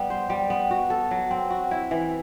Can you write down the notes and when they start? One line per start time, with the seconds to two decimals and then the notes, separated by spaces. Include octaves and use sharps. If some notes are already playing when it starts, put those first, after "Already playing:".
Already playing: G3 B3
0.10 C5
0.30 G3
0.50 B3
0.71 F#4
0.90 A4
1.11 F#3
1.31 C4
1.50 F#4
1.71 E4
1.91 E3